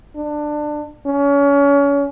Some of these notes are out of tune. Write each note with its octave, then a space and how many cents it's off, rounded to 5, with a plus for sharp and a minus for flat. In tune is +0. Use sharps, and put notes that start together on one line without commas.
D4 +20
C#4 +30